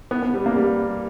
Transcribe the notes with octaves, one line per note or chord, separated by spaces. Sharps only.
B3
B3
G3
A#3
G3